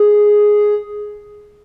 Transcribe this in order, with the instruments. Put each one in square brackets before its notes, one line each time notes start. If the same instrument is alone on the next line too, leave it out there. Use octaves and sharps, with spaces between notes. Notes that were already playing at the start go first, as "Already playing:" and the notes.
Already playing: [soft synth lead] G#4